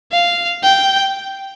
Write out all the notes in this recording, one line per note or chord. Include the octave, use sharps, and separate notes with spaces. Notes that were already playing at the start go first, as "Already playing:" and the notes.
F5
G5